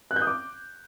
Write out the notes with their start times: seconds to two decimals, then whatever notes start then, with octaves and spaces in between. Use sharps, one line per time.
0.11 F#6
0.16 G6
0.22 D#6
0.27 D6